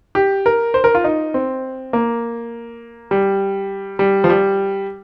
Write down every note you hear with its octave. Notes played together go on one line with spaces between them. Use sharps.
G4
A#4
C5
A#4
F4
D#4
C4
A#3
G3
G3
F3
G3